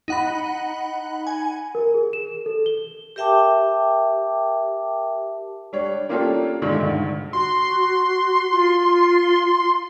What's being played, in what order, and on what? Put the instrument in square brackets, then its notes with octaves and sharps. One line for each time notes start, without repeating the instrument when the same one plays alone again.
[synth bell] D#4 F#5 B5
G#5
[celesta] A#4
G#4
E7
A4
G7
[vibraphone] G4 A#4 E5 G5 A5 D6
[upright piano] G3 D4 C#5
A#3 C#4 D4 F4 G4 A4
G2 A#2 D3 D#3 G#3 A3
D2 G2
[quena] F#4 [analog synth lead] C6
[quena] F4